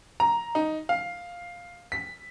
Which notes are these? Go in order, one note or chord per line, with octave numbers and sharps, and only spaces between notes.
A#5
D#4
F5
B6